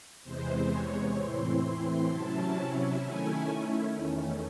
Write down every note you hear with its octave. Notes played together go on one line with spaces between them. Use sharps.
E2 C3 E3 G#3 C5
C#5
A2 E3 C4 E4 C6
C6
C3 F#3 C#4 E4 A5
D#3 A3 C#4 E4 G#5
E2 D#3 A3 C#4